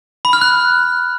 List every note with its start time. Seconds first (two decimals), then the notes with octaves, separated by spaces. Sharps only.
0.25 B5
0.33 F6
0.41 F#6